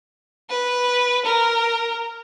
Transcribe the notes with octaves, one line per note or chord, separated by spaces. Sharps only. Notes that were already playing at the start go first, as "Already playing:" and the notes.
B4
A#4